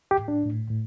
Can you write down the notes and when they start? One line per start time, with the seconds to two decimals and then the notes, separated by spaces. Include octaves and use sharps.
0.11 G4
0.19 A2
0.28 D4
0.45 A2
0.71 A2